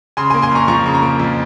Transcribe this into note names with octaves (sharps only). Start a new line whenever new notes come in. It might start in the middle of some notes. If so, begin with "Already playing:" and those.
C#3 G#5 C6
A#3 G#5 C6
G#5 C6
F2 A#5 C#6
F3 A#5 C#6
C#3
A#5 C#6
A#3
F2